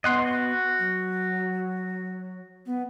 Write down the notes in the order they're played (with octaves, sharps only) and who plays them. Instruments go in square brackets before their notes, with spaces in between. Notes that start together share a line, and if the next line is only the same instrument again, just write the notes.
[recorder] B3 [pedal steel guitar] D#5 F#5 C6
[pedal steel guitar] F#4
[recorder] F#3
B3